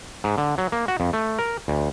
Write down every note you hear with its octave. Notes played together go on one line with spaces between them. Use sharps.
G#2
D3
F#3
A#3
F#4
F2
A3
A#4
D2